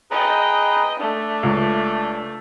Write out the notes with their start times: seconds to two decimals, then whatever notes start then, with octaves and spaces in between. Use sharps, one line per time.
0.11 G#4 B4 D#5 G5 A#5
1.00 A3 D4
1.43 C#2